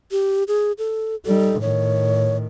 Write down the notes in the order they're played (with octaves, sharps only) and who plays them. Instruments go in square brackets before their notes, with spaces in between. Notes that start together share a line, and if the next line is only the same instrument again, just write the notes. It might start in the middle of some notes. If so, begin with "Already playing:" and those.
[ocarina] G4
G#4
A4
[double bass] G3 D#4 [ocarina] A4
[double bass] A2 D#3 [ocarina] C#5